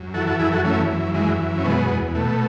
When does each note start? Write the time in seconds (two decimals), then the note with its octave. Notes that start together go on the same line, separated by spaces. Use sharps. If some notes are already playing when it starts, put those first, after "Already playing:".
Already playing: F#2
0.14 E3 F#4 A4
0.27 F#4 A4
0.39 F#2 E4 G#4
0.52 F#4 A4
0.65 E3 A3 C#4
0.90 F#2
1.14 E3 G#3
1.40 F#2
1.58 C#4
1.64 B2 G#3 B3
1.89 E2
2.15 B2 A3